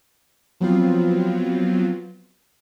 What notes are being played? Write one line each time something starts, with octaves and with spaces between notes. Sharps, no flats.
F3 F#3 B3 C4 F4